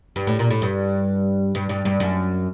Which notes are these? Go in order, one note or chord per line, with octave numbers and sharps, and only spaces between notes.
G2
A2
A#2
A2
G2
G2
G2
G2
F#2